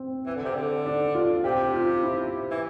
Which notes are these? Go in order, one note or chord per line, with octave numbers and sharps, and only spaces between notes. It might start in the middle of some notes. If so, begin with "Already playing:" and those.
Already playing: C4
E3
D3
C3
D3
D4
F4
C3 G4
F4
E4
E3